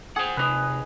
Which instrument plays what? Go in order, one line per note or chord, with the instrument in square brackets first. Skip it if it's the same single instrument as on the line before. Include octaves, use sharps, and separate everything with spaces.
[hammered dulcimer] G#4 [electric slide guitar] C5 F#5
[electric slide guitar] C3 D#4 [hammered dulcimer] B4 D#5